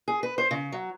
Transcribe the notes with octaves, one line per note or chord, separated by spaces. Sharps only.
G#4
B4
C5
C#3
F#3